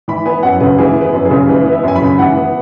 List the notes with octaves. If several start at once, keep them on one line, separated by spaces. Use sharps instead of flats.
E3 B5
B3 G#5
F#2 F#5
C#3 B4
E3 G#4
B3
B4
F#2
G#4
C#3
E3 B4
B3
E5
F#2 G#5
B5
C#3
E3 F#5
B3